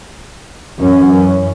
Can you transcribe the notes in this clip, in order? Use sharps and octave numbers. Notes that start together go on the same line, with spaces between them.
F#2 E3 C#4